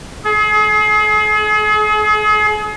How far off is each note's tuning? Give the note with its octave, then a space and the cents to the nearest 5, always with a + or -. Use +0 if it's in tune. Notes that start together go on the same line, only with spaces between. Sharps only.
G#4 +35